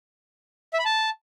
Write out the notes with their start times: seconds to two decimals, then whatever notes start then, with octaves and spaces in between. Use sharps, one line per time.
0.74 E5
0.79 B5
0.85 A5